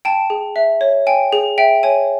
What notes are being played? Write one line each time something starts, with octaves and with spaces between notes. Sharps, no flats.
G5 A5
G#4
E5
C#5
G5 G#5
G#4
E5 G5
C#5 G#5